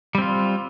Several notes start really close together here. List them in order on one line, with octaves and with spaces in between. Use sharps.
G3 C4 F4